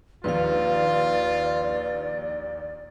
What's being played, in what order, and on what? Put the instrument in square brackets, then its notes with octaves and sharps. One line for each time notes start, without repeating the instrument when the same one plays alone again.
[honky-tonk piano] A#1 D#2 [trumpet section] F4 [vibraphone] B4 F5 [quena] D5